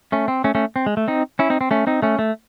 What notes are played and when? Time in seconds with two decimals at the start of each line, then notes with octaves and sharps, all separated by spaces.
0.12 A3 C#4
0.28 C4
0.44 A3 C#4
0.55 A3 C#4
0.76 C4
0.86 G#3
0.97 A3
1.08 C4 D#4
1.39 C#4 E4
1.50 C4 D#4
1.61 C4
1.71 A3 C#4
1.87 C4 D#4
2.02 A3 C#4
2.19 A3